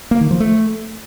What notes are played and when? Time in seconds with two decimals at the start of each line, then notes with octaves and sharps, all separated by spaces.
0.11 A#3
0.21 D#3
0.31 F3
0.40 A3